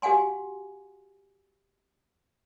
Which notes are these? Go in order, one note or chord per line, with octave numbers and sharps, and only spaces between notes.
F#4 G4 F5 F#5 G#5 C6